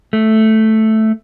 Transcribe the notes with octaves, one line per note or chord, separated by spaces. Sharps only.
A3